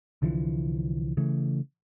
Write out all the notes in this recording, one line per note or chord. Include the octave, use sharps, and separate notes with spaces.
C2 D3 E3 F3
C#3 E3 A3